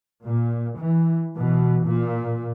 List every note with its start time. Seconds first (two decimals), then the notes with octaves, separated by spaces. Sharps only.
0.23 A#2
0.78 E3
1.36 B2 E3
1.85 A#2